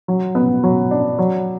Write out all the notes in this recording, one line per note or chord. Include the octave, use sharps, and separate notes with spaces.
F#3
B3
F#3
D4
F#3